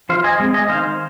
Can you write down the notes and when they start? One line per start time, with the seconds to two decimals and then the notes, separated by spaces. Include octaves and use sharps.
0.09 F3 C5 F5
0.24 D#5 G#5
0.40 G#3 C4
0.54 D#5 G#5
0.69 D#3 C5 F5